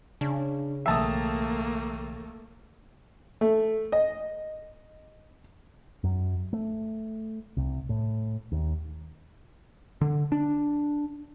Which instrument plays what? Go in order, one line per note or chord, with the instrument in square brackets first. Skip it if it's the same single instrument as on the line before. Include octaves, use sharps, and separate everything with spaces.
[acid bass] C#3 [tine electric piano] D4
[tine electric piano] B1 E3 G5 [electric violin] A3 A#3 [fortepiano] E5 A5 D#6
[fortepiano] A3
D#5
[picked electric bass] F#2
A3
C2
A2
D#2
D3
D4